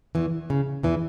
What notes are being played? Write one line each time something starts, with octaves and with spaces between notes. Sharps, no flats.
E2 E3
C#3
E2 E3